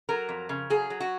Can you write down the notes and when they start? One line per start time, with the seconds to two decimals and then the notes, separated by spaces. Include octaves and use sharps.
0.09 F#3 A#4
0.29 F2
0.49 C#3
0.70 F#3 G#4
0.90 F#3
1.00 F#4